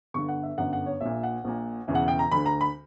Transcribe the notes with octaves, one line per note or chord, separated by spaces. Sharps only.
G1 G2 D3 C#6
F#5
E5
G1 F#2 D3 F#5
F#5
C#5
A#1 A#2 E5
F#5
A#1 A#2
E1 E2 C#3 E3
F#5
G5
A#5
D2 D3 B5
A#5
B5